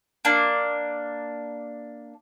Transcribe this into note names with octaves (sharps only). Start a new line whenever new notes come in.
A#3 D4